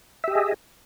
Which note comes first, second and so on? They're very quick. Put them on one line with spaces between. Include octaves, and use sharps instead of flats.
E5 G4 D#5 G#4